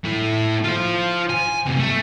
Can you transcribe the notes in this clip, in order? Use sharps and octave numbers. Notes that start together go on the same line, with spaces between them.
A3 E4
F4 C5
G#5
F#2 C3
A3